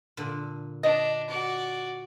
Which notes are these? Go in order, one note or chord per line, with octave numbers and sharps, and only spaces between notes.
A#2 D3
D4 D#5
F#4 D5